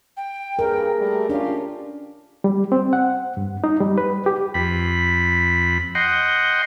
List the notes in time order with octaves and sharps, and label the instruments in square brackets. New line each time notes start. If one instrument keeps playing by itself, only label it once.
[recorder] G5
[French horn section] G2 [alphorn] G#4 [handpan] A#4
[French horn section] G3 A3
[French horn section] C#4 F4 [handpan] D4 [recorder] G4
[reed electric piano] G3
C4
F#5
G2
D#4
G3
B4
G4
[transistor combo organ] F2 B5
D#5 F#5 G5 C6